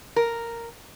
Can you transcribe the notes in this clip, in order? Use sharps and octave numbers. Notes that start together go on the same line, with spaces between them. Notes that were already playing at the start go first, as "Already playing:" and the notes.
A#4